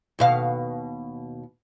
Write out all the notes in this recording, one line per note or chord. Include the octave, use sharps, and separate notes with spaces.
D#2 B2 F5